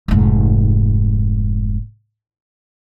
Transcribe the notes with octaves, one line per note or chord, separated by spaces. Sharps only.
F1 G#2